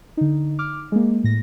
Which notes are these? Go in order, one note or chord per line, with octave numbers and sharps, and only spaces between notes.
D3 D#4
D6 F6
G#3 A#3
A2 A#6